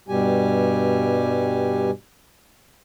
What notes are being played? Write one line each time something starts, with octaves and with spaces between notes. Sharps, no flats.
G2 B2 G3 G4 G#5